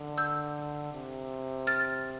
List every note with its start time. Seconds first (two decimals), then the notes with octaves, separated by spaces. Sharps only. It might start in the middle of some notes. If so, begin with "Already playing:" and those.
Already playing: D3
0.18 E6 G6
0.93 C3
1.67 F6 A6